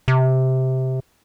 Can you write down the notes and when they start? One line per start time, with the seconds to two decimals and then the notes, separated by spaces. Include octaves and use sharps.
0.08 C3